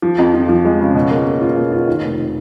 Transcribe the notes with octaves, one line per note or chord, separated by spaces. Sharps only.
F3
F2
F3
F3
G#3
C#3
B2
A#3
A#3
F4
B2
F4
D#3
F1